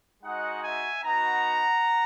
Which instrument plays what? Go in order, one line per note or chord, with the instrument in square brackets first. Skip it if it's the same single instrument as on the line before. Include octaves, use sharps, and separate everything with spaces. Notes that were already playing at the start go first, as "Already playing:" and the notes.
[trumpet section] G#3 D#4 F#4 D#5 F#5
E5 G#5
B3 D#4 F#4 F#5 A#5